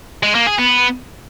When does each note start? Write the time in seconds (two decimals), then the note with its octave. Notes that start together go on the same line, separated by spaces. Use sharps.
0.23 G#3
0.35 A#3
0.47 G#4
0.59 B3